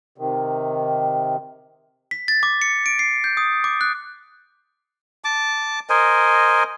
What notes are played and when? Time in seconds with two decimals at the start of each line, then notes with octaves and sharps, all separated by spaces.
0.18 C3 D#3
2.11 B6
2.28 A6
2.43 D6
2.62 C#7
2.86 D7
2.99 C7
3.24 G6
3.37 D#6
3.64 D6
3.81 F#6
5.24 A5 D6
5.89 A#4 C5 D#5 G#5